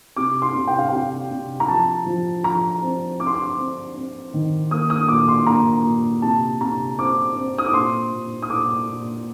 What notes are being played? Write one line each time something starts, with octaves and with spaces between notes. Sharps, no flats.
C3 D6
C6
C3
G5
F5
C3 G5
C3
A#5
F3 A5
F3
F3 A#5
C4
C4 D6
C6
D6
C4
C4
D#3
A#3 D#6
D#6
A#2 D6
C6
A#3 A#5
A#2
C3 A5
C3 A#5
C4 D6
C4
D#6
D6
A#2 C6
A#2
D#6
A#2 D6
A#2